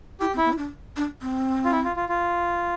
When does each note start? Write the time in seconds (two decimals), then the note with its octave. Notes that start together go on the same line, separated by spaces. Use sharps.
0.20 E4 G4
0.34 C4
0.38 E4
0.45 B3
0.53 E4
0.58 D4
0.97 D4
1.22 C4
1.64 F4
1.71 E4
1.84 F4
1.96 F4
2.09 F4